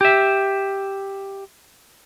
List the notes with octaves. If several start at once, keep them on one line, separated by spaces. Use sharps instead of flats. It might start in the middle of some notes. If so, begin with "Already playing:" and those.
G4 E5